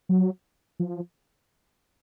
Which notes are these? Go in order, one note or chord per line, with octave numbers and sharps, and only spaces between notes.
F#3
F3